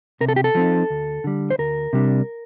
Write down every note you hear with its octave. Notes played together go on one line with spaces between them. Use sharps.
C3 A#4
A4
G4
A4
F3 C4 D#4
D2
D3 G3
C5
D2 A#4
C3 G3 D4